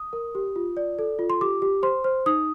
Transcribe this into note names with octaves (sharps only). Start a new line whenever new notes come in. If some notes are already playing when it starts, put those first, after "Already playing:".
Already playing: D#6
A#4
G4
F4
D5
A4
F4
C6
G4 D6
G4
C5 C6
C5
D#4 D#6